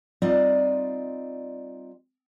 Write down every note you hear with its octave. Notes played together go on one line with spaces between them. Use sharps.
G3 C4 D#4 F4 D5 D#5